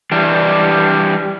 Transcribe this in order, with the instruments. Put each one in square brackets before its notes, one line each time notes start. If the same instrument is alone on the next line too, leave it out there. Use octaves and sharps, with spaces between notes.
[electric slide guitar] E3 G3 D4 D5